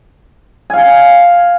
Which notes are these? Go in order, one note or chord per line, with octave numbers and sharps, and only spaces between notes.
F5 G#5